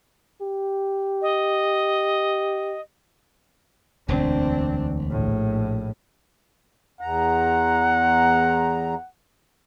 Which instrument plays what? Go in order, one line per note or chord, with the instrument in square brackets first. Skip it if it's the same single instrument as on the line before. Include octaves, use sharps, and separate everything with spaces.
[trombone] G4
[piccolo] D#5
[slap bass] E1 D2 [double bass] C4 D4
[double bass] A#1 A2
[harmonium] E2 A#5 [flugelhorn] F#5